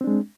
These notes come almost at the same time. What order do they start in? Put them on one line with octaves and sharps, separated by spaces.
C4 D4 G#3